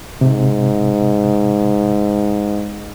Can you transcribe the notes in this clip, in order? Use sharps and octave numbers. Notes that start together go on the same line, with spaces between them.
G#2 C3